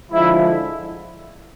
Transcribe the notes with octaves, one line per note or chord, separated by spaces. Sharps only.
D3 F3 G#3 E4